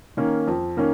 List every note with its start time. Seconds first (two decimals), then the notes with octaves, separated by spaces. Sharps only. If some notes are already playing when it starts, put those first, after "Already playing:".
0.17 D#3 A#3 C#4
0.47 F2
0.77 D#3 A#3 C#4